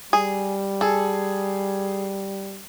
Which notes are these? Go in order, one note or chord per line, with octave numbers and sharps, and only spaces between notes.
G3 G#4
G#4 A4